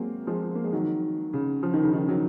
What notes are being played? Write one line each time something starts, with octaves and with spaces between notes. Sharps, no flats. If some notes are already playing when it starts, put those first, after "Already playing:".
Already playing: F#3 G#3 A#3 C4
F3 G#3
A#3
G#3
D#3 F#3
C#3
F3
D#3
C#3
D#3
D#3 F#3